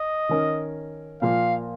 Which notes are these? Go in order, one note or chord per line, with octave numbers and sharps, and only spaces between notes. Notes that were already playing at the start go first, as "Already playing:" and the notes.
Already playing: D#5
D#3 C#4 A#4
A#2 F3 A#3 F5